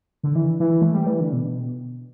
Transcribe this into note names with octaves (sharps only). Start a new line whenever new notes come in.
D3
E3
E3
A3
G3
E3
D3
B2